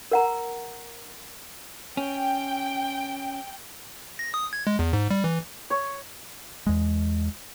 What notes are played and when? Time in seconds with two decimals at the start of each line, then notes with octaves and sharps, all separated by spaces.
0.11 A#4 F#5 A#5
1.97 C#4 G5
4.19 A#6
4.34 D#6
4.53 G#6
4.67 G#3
4.79 E2
4.93 G#2
5.11 G3
5.24 E3
5.70 C#5
6.67 E2 G#3